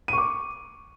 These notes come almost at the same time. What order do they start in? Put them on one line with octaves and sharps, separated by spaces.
D#7 C#6 D6